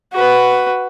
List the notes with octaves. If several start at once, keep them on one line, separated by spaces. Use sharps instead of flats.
F#4 B4